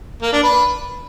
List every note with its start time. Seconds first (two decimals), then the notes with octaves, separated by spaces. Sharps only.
0.22 A#3
0.33 D4
0.43 B4